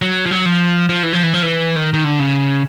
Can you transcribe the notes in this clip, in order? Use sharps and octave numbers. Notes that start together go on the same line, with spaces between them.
F#3
F3
F#3
F3
F3
E3
F3
E3
F3
E3
D#3
D#3
D3
C#3